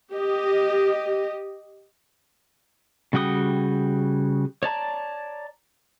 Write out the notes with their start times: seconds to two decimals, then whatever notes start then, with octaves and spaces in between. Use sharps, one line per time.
0.14 G4 D#5
3.13 C#3 G3 F#4 G5 D#6
4.63 C#5 D5 A5 A#5